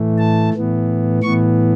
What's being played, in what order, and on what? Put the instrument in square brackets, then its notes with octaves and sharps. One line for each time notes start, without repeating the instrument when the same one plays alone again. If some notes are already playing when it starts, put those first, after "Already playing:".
Already playing: [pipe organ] A2 E3 A3
A5
A2 E3 B3
A2 E3 B3 C#6